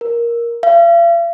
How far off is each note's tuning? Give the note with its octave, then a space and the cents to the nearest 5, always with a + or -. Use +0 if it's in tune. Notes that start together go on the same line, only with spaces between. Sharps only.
A#4 +10
F5 -45